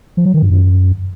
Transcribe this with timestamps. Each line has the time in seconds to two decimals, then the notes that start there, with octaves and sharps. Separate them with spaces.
0.17 F3
0.26 F#3
0.34 D#3
0.42 G2
0.51 F#2